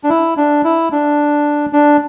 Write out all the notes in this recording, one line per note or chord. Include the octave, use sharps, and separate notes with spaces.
D4
E4
D4
E4
D4
D4